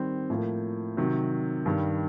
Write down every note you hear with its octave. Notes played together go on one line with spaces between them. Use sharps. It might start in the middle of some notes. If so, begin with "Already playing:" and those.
Already playing: D#3 G3 C4
A2 F3 A#3
C3 D#3 F#3
G2 D#3 G3